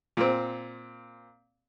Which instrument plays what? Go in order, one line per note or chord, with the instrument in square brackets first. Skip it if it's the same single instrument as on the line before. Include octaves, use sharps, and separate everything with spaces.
[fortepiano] A#2 C4